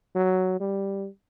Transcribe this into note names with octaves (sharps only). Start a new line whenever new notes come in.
F#3
G3